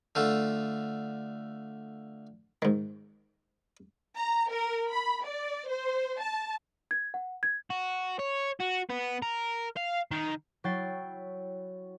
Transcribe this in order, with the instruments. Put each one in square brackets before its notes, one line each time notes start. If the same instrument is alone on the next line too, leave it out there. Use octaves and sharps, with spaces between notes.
[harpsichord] D3 A3 F4
G#2 D#3
[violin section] A#5
A#4
B5
D5
C5
A5
[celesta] G#6
F#5
G#6
[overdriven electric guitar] F#4
C#5
F#4
B3
A#4
F5
D#3
[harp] F#3 E4 C#5 G5 A6 C7